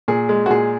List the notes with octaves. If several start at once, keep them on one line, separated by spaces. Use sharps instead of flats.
A#2 G#4
G#3
F#4
A#2 G#4